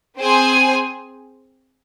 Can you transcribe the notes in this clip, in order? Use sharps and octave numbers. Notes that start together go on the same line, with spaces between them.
C4 G#4 C5 G#5